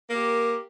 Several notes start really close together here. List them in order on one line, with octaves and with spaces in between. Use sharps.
A#4 A#3 G4